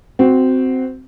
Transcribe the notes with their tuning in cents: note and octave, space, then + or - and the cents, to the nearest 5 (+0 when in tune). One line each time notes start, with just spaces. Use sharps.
C4 -10 F#4 +5